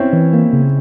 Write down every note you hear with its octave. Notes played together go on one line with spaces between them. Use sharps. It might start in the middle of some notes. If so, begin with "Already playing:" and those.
Already playing: C4 C#4 E4
E3
A#3
C#3